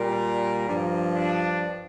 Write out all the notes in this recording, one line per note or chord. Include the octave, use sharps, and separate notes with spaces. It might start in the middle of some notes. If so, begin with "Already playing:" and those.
Already playing: A#2 G3 A#4
G2 F3
D4